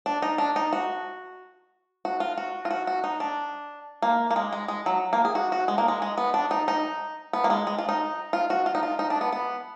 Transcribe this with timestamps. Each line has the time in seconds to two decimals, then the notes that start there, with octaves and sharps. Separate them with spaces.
0.06 D4
0.22 D#4
0.38 D4
0.56 D#4
0.73 F#4
2.05 F#4
2.20 F4
2.38 F#4
2.65 F4
2.71 F#4
2.87 F#4
3.04 D#4
3.20 D4
4.02 A#3
4.31 A#3
4.36 G#3
4.53 G#3
4.68 G#3
4.86 F#3
5.13 A#3
5.25 G#4
5.35 F#4
5.52 F#4
5.68 G#3
5.78 A#3
5.88 G#3
6.02 G#3
6.18 B3
6.34 D4
6.51 D#4
6.68 D#4
7.33 B3
7.44 A#3
7.50 G#3
7.67 G#3
7.78 F4
7.89 D#4
8.33 F4
8.50 F#4
8.66 F4
8.75 D#4
8.83 F4
8.99 D#4
9.10 D4
9.21 B3
9.32 B3